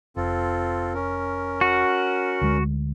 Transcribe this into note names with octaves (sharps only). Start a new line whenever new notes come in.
F1 C4 F4 A4
C#4 A#4
F#4
D2 G#3